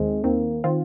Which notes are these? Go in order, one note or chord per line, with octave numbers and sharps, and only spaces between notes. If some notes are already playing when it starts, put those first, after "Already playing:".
Already playing: D#2 D#3 G#3 C4
D#2 D#3 A#3 C4
D#3 C4 F4